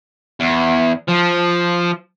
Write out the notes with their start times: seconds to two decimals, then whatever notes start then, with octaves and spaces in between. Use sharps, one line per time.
0.40 E2
1.09 F3